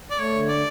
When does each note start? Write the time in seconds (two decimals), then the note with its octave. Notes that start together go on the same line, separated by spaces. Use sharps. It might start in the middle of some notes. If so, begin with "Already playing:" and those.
0.10 D5
0.18 A3 C#5
0.33 D3
0.48 D5